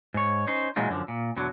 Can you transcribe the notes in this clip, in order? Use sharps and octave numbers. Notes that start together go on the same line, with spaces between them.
G#2 C#5
C#4 D#4 C5
A#2 E3 F#3 G#3 D#4 F4
F#2 D3 F3
A#2
E2 B2 D3 F#3